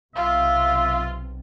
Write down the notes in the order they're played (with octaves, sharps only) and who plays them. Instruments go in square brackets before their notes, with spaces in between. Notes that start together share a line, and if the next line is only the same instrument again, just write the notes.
[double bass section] B1 C3 [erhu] F4 [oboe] E5 [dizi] F5